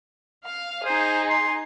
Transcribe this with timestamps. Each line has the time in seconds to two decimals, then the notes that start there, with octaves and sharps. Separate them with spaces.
0.44 F5
0.85 D#4 G#4 C5
1.29 C6